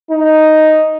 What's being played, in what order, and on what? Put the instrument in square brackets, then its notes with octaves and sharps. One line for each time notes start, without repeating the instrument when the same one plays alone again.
[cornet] D#4